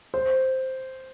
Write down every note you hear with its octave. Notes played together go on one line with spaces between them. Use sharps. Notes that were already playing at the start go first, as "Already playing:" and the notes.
C5